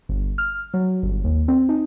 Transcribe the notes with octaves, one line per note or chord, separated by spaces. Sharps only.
G1
F6
F#3
G1
D#2
C4
D#4